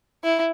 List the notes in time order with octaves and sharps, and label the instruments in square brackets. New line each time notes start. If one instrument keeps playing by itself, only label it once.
[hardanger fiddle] E4